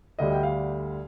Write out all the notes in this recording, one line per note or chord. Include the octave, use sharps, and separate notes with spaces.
D2 D3 G3 D#5
G5
F5